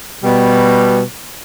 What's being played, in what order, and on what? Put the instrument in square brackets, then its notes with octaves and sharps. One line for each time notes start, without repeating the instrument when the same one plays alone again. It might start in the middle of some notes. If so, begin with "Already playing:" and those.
[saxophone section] B2 G3